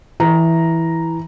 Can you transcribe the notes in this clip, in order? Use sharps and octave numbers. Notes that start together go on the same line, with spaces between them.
E3 A#5